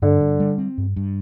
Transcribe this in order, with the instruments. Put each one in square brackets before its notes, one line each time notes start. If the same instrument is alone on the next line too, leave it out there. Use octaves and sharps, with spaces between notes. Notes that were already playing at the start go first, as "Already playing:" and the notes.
[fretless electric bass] G2 [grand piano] D3
[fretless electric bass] G2
G3
C4
G2
G2